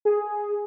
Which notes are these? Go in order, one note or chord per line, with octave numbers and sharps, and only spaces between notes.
G#4